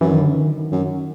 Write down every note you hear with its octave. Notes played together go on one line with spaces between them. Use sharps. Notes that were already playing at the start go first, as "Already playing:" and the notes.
F#2 E3
D#3
D3
D#3
F#2